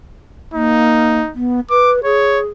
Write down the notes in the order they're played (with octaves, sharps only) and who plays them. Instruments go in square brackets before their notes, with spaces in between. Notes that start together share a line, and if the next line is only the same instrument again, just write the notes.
[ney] A#3 [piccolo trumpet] D#4
[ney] B3
[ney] B4 [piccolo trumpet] D6
[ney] G#4 [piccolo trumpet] C#5